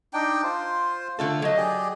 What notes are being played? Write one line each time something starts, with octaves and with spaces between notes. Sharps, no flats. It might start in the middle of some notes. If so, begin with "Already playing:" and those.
D4 D#4 G5
F4 C5
D3 A3 F4 A4
F#3 D#5
G4 G#4 D5